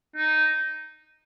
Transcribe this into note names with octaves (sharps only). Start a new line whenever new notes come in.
D#4